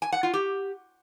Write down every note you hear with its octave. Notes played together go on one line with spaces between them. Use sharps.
G#5
F#5
F4
G4